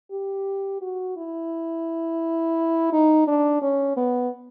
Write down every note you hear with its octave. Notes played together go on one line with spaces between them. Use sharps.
G4
F#4
E4
D#4
D4
C#4
B3